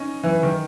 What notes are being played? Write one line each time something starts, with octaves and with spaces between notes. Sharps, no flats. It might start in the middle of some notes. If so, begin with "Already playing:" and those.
Already playing: C#4 D#4
E3
D#3